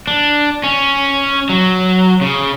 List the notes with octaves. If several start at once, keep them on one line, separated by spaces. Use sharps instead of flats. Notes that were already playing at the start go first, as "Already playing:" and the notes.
D4
C#4
F#3
C#3